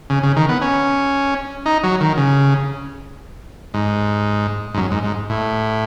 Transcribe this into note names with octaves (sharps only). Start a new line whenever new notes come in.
C#3
C#3
D#3
B3
C#4
D#4
F#3
D#3
C#3
G#2
G#2
F#2
G#2
G#2
A2